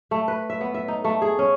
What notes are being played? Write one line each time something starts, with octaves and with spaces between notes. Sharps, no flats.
A3
B4
E5
B3
E5
D#4
A3
G#4
C#4